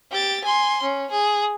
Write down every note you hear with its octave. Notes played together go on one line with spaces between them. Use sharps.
G4 A6
G#5 C6
C#4
G#4